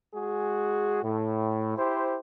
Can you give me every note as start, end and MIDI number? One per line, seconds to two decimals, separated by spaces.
0.14 1.02 56
0.14 1.02 66
0.14 1.02 68
1.03 1.75 45
1.77 2.17 64
1.77 2.17 67
1.77 2.17 72